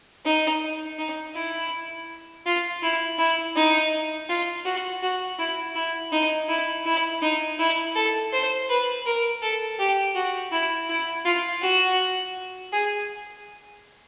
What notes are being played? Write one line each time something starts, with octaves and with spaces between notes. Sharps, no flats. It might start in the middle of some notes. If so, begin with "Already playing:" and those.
D#4
D#4
E4
F4
E4
E4
D#4
F4
F#4
F#4
E4
E4
D#4
E4
E4
D#4
E4
A4
C5
B4
A#4
A4
G4
F#4
E4
E4
F4
F#4
G#4